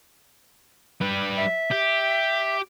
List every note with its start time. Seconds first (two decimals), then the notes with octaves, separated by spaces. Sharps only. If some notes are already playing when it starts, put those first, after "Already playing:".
1.01 G3 B4
1.37 E5
1.71 G4